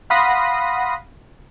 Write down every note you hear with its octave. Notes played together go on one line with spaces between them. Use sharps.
F5 F#5 B5 C6 D#6 A#6